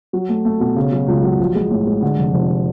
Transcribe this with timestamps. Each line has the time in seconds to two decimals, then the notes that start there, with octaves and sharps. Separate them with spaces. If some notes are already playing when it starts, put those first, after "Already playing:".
0.13 F#3
0.29 A3
0.45 A3
0.60 B2
0.76 C#3
0.92 F#3
1.08 C#2
1.23 F#3
1.39 A#1
1.55 G#3
1.71 A2
1.87 G#3
2.02 D3
2.18 F1
2.34 F1